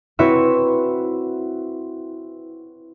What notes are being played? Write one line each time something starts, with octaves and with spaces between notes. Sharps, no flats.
C4 E4 F#4 B4 C#5 E5